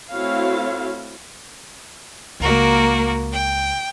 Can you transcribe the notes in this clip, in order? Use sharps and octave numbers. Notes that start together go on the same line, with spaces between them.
A3 C4 E4 F#4 C#5 F5
C#2 A#3 F#4 A#4
G5